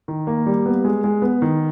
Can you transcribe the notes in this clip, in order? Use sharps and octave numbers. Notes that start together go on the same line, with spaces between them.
D#3
A#3
G3
B3
G#3
G#3
B3
D#3